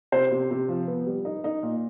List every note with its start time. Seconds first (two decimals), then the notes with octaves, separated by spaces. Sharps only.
0.12 C3 C5
0.32 C3
0.51 C3
0.69 F3
0.88 B3
1.07 G3
1.25 D#4
1.44 D#4
1.63 A#2